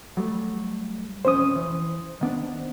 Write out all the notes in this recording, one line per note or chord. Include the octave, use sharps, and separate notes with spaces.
F#3 G3 A3
E1 F2 C#4 C5 D#6
E3
D#3 B3 D4